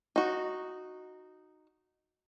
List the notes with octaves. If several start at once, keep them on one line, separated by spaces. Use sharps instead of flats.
D#4 F#4